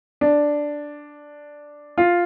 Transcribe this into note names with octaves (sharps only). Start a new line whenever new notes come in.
D4
F4